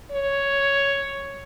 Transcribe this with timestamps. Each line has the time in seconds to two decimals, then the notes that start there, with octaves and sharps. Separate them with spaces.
0.12 C#5